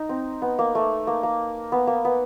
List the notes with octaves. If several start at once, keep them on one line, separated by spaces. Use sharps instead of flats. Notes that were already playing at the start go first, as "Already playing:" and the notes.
Already playing: D#4
C4
B3
A#3
A3
A#3
A#3
B3
A#3
B3